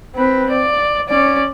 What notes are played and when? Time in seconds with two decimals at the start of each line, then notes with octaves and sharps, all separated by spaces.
0.15 C4 B4
0.50 D5
1.09 C#4 D5